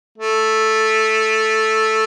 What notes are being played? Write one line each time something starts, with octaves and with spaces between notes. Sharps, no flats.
A3